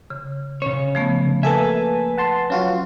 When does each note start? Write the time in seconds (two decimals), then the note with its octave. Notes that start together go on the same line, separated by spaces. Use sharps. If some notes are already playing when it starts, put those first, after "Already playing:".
0.10 C#3
0.62 C#3 C#4 C#5
0.95 F3 A3 B3
1.43 A#3 A4 B4 E5 G#5
2.18 F#5 A5 C6
2.50 F#3 C#4 F4 F#4